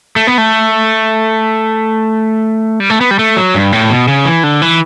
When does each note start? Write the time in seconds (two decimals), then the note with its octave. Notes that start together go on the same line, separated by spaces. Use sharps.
0.16 A3
0.27 B3
0.38 A3
2.80 G3
2.90 A3
3.01 B3
3.11 G3
3.19 A3
3.37 F#3
3.54 G2
3.72 A2
3.90 B2
4.08 C#3
4.25 E3
4.43 D3
4.62 E3